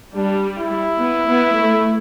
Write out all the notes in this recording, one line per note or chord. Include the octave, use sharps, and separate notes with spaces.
G3 D4
E4
B3
B3
A3